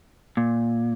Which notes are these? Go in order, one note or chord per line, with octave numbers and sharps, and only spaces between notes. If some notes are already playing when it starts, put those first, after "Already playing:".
A#2